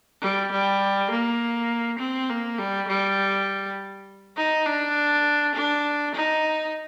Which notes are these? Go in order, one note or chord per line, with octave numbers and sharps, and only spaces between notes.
G3
G3
A#3
C4
A#3
G3
G3
D#4
D4
D4
D#4